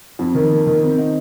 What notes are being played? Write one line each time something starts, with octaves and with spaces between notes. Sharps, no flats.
F2
D#3
A#3
D#3
C4
D#4